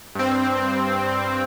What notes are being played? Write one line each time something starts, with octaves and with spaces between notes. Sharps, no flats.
G2 C4